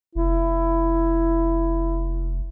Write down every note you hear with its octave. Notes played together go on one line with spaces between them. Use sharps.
F1 E4